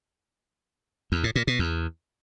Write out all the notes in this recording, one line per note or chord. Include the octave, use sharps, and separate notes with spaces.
E2
A2
A#2
B2
E2